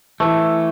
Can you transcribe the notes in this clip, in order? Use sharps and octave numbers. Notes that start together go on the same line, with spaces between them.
E3 A3